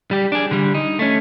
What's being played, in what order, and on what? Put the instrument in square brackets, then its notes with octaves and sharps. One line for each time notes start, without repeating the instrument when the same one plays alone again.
[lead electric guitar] G3 G4
D4 G#4
D3 G3
D#4
A3 C#4